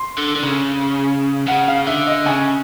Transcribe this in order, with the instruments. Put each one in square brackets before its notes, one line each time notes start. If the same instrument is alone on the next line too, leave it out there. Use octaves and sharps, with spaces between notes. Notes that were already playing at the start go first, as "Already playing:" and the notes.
Already playing: [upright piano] C6
[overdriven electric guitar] D3
D3
C#3
[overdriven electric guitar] C#3 [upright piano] F#5
[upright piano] F5
[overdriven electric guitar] D3 [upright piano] E5
[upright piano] D#5
[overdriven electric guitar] C#3 [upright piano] G#5